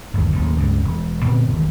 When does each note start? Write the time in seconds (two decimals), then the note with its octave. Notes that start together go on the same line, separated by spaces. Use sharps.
0.14 G1 D#2
0.32 F#1 D#2 A2 D#3
0.58 C#2 G2
0.84 E1
1.25 A#2 D3 B3 C4
1.49 E1 B1 D#3